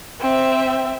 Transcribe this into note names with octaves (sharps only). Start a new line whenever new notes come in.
C4 E5